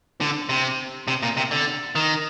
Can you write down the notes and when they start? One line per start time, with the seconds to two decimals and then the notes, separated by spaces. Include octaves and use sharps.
0.21 D3
0.49 C3
1.08 C3
1.23 A#2
1.37 C3
1.51 D3
1.95 D#3